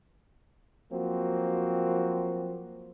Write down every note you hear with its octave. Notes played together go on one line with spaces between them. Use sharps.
F3 F#3 A#3 C4 F#4